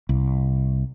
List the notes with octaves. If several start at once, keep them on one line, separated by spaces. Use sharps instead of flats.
C2